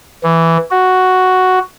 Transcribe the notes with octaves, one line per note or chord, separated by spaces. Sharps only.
E3
F#4